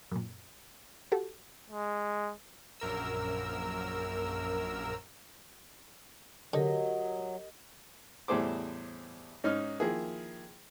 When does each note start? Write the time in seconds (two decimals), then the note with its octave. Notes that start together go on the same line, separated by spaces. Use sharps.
0.12 F#2 A#2
1.12 F#4 G4 A4
1.70 G#3
2.80 A#1 F#2 A#4 E6
6.54 D3 F#3 G4 A#4 D#5
8.28 E2 A2 G3 G#4 C5 D6
9.44 G#2 C#4 D#4 D#5 D#6 F6
9.80 D#3 F3 A#3 E4 G#4